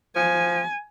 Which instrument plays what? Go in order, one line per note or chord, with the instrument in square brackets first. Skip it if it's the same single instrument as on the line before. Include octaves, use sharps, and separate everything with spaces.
[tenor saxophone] F3 [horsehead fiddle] G#5